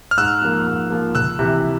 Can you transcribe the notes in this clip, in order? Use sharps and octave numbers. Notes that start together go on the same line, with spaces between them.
F6
G#2 E6 F#6
F3 A#3
G#2
F3 A#3
C#2 E6 F#6
C3 E3